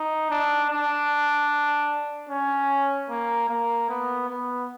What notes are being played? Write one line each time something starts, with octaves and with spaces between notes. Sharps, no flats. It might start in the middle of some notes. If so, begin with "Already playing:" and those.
Already playing: D#4
D4
D4
C#4
A#3
A#3
B3
B3